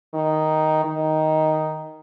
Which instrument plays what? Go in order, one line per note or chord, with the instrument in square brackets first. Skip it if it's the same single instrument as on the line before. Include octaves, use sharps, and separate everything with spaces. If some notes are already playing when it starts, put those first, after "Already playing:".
[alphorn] D#3
D#3